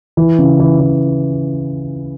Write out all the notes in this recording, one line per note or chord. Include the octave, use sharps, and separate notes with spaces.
E3
C#3
E3
E3